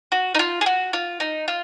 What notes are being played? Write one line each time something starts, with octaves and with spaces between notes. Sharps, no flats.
F#4
D#4
F4
G#4
F#4
F4
D#4
F4